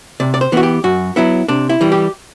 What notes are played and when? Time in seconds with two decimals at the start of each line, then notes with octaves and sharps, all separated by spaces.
0.20 C3 D5
0.34 D5
0.41 C5
0.52 E3 B3 F#4
0.63 G4
0.84 F#2 F#4
1.16 F#3 B3 E4
1.48 C3 D4
1.69 E4
1.81 E3 G3
1.92 G4